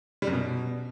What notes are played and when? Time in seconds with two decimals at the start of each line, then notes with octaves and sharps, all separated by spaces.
0.22 G3
0.27 F#2
0.33 B2